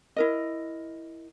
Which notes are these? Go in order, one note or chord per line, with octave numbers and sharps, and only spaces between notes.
E4 A#4 D#5